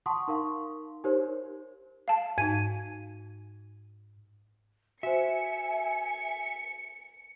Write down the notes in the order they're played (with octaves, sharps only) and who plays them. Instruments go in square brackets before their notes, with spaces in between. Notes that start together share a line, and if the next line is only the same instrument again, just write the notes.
[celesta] F#5 A5 C6 C#6 D#6
D#4 A#4 F5 C6 C#6
D#4 G4 A#4 C5 C#5
[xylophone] F5 A5
[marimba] G#2 D#4 [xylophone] G#6 D#7
[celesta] F#4 C5 [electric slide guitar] E5 [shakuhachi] G#5 [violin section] C#7